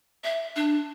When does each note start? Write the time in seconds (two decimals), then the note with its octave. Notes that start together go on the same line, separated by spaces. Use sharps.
0.24 E5
0.56 D4